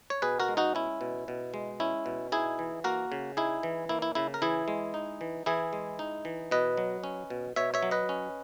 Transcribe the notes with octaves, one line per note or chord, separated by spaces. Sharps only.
C#5
B2 G#4 B4
F#4 A#4
G#3
D#4 F#4
C#4 E4
B2
B2
G#3
C#4 E4
B2
D#4 E4 G#4
E3
A#3 F#4 A#4
C#3
D#4 E4 G#4
E3
A#3 E4
E4
C#3 E4
A#4
E3 E4 G#4
G#3
D#4
E3
E3 E4 G#4
G#3
D#4
E3
B2 B4 D#5
F#3
C#4
B2
B2 C#5 E5
C#5 E5
F#3
B4 D#5
C#4